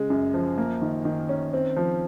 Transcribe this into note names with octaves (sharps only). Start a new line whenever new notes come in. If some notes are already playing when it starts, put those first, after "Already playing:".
Already playing: C#3 G#3
F#2
F3
A#3
D#3
D#3
C#4
C4
F3